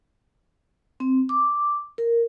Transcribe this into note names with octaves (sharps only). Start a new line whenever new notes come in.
C4
D6
A#4